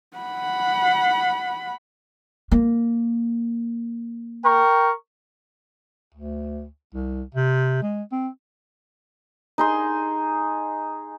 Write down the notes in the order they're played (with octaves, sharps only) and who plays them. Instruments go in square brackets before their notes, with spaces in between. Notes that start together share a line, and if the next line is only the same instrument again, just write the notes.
[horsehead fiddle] F#5 B5
[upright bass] A#3
[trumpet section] A#4 G5 C#6
[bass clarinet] D2
C2
C3
G#3
C4
[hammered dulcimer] D#4 G#4 C6